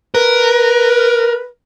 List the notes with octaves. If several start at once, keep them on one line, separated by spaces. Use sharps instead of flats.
A#4 B4